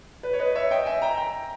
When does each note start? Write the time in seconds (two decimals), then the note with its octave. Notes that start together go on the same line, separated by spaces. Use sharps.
0.23 B4
0.33 C#5
0.39 B4 D#5
0.55 C#5 E5
0.71 D#5 G5
0.86 E5 G#5
1.02 G5 A#5
1.17 G5 A#5